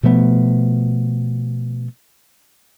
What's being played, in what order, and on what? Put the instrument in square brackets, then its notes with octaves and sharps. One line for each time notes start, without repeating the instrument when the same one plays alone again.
[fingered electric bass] B2 F3 A3 B3